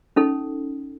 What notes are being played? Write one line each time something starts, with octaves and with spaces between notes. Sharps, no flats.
C#4 D#4 A4